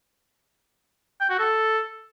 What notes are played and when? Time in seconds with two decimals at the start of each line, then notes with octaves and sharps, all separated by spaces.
1.21 G5
1.30 F#4
1.39 A4